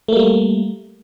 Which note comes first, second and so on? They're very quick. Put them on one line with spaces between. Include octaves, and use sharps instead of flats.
A3 A#3 G3